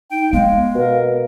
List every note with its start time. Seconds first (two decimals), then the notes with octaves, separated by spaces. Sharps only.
0.11 D#4 G5
0.33 G#3 B3 F5
0.75 B2 A#4